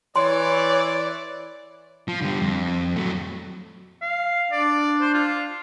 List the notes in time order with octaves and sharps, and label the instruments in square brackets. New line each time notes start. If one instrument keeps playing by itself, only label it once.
[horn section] E3 D5 [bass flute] C#5 [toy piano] C6
[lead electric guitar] F3
D3 G3
F2
F#3 A3
[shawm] F5
[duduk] D4 [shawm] D5
[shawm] C5
F4